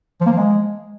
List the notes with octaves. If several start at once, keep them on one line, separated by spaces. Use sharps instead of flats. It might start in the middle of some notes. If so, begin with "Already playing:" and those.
F3
A#3
F3
G#3